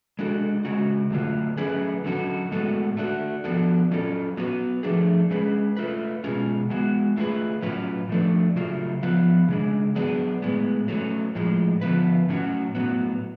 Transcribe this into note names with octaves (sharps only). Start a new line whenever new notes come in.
G#3 D4 F#4 A4
C#3 G#3 C#4 F#4
D3 F#3 A3 F4 B4
F#3 A3 C#4 G#4 B4
D3 F#3 C#4 F#4 A4
A2 G#3 B3 F#4 A4
A3 D4 F#4
F3 B3 D4 F#4 A4
F#3 C#4 F4 A4
F#3 B3 F#4 B4
F3 A3 D4 G#4
G#3 C#4 G#4 B4
A3 F4 B4
B2 G#3 C#4 F4 G#4
G#3 B3 F#4
A3 F4 G#4 B4
A2 F#3 C#4 F4 B4
F3 A3 D4
C#3 F#3 A3 F4
F3 B3 F4 B4
C#3 G#3 D4
F#3 B3 D4 G#4 B4
A2 G#3 B3
F#3 A3 C#4
A2 F3 G#3
D3 F3 B3 F4 B4
A2 F#3 C#4 F#4
A2 F#3 B3